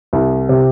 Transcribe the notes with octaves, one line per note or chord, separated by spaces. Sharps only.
C2
C3